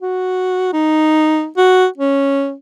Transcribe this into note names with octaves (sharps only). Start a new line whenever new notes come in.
F#4
D#4
F#4
C#4